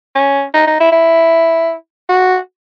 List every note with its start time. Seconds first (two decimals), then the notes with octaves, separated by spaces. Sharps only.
0.15 C#4
0.54 D#4
0.67 D#4
0.80 E4
0.92 E4
2.09 F#4